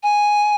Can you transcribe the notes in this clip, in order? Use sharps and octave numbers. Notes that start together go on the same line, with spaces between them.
G#5